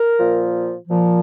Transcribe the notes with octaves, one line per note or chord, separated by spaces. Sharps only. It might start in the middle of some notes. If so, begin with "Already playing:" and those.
Already playing: A#4
A#2 F3
A#2 F3